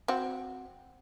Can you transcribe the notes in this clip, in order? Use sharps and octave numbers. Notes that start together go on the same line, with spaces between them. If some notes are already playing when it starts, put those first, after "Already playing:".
C4 F#4